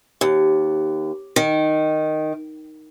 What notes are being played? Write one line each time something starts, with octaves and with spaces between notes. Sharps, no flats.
D#2
D#3